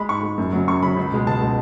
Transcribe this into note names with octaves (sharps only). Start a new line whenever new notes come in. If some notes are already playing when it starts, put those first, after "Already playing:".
Already playing: G#3 B5
G#2 C#6
G#3
F#2
C#3 F#3
F#2 C#6
C#3 F#3 B5
C#2
B2 G#3
C#2 A5
B2 G#3